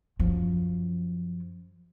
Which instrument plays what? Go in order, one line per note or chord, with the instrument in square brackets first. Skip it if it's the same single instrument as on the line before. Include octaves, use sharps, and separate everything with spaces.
[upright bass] F#2 F3